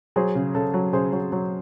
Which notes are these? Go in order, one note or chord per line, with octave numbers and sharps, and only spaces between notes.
F#3 G#4 C5
C#3
C#3 A4
F#3
C#3 G#4 C5
F#3
F#3